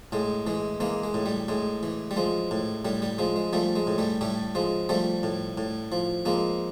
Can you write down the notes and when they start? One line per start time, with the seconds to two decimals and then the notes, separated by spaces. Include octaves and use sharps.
0.12 A2 G#3
0.47 E3 G#3
0.80 E3 G#3 A#3
1.03 G#3
1.14 A2
1.26 G3
1.48 A2 G#3
1.83 E3
2.11 G3
2.16 F3 G#3
2.51 A2
2.85 A2 G3
3.02 G3
3.18 F3 G#3
3.36 G#3
3.53 F3 G3 A3
3.76 G#3
3.87 A2
3.98 G3 A3
4.21 A2 G3 A3
4.55 F3 G#3
4.89 F3 G3 A3
5.23 A2
5.57 A2
5.92 F3
6.25 F3 G#3 A#3